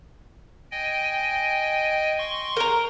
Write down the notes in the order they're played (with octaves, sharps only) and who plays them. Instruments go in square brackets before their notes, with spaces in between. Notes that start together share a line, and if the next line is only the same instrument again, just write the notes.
[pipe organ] D#5 G5 G#5
C6 C#6
[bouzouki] A#4 A#5